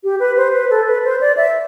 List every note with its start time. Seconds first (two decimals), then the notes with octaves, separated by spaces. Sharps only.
0.04 G4
0.20 B4
0.37 C5
0.53 B4
0.70 A4
0.86 B4
1.04 C5
1.21 D5
1.37 E5